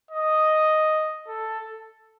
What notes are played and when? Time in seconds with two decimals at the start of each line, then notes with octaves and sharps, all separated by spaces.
0.11 D#5
1.28 A4